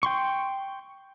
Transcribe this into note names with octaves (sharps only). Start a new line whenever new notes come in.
G5 C6 C#6